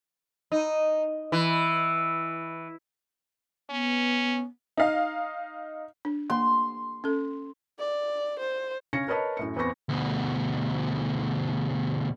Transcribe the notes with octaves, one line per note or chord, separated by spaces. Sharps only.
D#4
E3
B3 C#4
D#4 F5
D4
A#3 C6
C#4 A4
D5
C5
C#3 C#4 G#6 A#6 C#7
A#4 B4 C#5 D#5 A5 B5
F#2 A2 C#7
E2 B3 C4 C#6 A#6
D2 B2